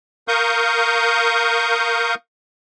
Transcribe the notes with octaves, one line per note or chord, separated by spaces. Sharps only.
A#4 F5 C#6 D#6 G6